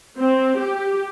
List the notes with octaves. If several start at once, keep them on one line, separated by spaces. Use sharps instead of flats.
C4
G4